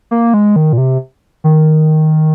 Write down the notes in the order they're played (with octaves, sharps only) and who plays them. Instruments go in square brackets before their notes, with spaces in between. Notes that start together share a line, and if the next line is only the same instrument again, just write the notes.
[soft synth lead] A#3
G#3
D#3
A#2
C3
D#3